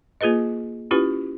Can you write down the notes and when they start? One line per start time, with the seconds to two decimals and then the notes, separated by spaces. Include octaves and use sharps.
0.21 A#3 F4 G#4 B4 D#5
0.91 C#4 E4 F4 G4 B4